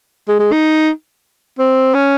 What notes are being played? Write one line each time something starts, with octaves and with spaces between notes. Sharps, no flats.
G#3
G#3
D#4
C4
C#4